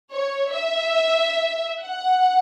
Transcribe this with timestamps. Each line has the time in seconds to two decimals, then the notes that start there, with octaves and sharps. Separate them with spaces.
0.11 C#5
0.53 E5
1.80 F#5